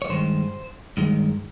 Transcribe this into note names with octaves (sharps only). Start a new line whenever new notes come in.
C#5
G2 D#3 G#3 C5
G2 D#3 G#3